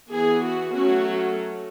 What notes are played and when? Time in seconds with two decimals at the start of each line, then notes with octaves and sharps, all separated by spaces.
0.11 E3 B3 G#4
0.42 F#4
0.73 F#3 A3 C#4 F#4